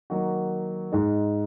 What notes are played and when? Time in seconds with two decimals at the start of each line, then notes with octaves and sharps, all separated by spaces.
0.10 D#3 F#3 A#3 D#4 F#4
0.92 G#2 G#3 D#4